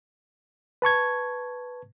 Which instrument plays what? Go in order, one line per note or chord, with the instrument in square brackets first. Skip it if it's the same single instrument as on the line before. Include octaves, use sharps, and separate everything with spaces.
[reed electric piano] B4 A5 C#6 G#6